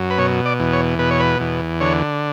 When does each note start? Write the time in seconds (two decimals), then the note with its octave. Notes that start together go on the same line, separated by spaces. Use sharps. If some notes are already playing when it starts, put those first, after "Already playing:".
Already playing: F#2
0.10 B4
0.18 B2 C#5
0.46 D5
0.60 E2
0.73 C#5
0.99 B2 B4
1.11 C#5
1.20 B4
1.40 E2
1.81 D3 C#5